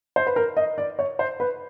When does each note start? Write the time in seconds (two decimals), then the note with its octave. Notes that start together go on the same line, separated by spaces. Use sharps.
0.16 C5
0.27 B4
0.36 A#4
0.57 D#5
0.78 D5
0.99 C#5
1.19 C5
1.40 B4